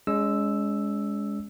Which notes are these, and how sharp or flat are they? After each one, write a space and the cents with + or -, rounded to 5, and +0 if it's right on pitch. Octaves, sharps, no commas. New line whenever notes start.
G#3 -5 C#4 +35 E6 +0